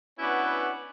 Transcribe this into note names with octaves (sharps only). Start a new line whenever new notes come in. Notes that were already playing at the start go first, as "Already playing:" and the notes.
B3 C#4 D4 E4 F#4 B4